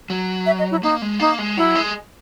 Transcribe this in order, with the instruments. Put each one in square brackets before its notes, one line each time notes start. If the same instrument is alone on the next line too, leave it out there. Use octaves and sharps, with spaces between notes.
[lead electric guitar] F#3
[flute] E5
D#5
E4
[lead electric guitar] A#3 [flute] D#4
[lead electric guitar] G#3
[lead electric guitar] A#3 [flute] D#4
[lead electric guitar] G#3
[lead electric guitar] F#3 [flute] E4
[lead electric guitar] G#3